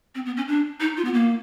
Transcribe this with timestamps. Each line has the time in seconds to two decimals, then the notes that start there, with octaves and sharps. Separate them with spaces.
0.15 C4
0.26 B3
0.37 C#4
0.48 D4
0.80 D#4
0.97 F4
1.05 B3
1.14 A#3